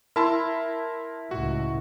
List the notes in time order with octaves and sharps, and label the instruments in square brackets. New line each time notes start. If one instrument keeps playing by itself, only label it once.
[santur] E4 [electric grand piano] A#4 A5 C6
[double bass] C#2 A2 [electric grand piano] F#4